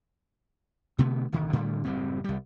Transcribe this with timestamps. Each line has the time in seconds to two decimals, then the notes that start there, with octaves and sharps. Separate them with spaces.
0.98 B2 D3 A3 B3
1.32 D1 B1 D3 D#3
1.53 A2 D3 G3 A3
1.85 F#1 A2 G3 C4
2.24 C2 G3